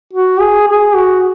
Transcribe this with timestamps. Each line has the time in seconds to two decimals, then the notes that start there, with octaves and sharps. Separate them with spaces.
0.13 F#4
0.41 G#4
0.68 G#4
0.95 F#4